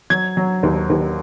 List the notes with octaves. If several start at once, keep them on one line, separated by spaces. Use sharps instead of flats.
F#3 G#6
F#3
D#2
D#2